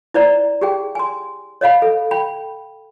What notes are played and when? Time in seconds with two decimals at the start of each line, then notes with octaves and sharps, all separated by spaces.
0.14 E4 C5 D5 A#5
0.61 G4 G#4 G5
0.95 G#5 C6
1.61 C#5 D#5 F5 B5
1.82 A4
2.11 G5 B5